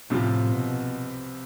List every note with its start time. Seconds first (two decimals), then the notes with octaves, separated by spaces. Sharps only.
0.10 C2 A2 C3 F3 C4 F4
0.51 B2